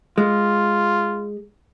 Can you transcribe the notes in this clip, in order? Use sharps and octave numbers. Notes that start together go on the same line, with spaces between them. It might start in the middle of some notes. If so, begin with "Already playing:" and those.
G#3 F4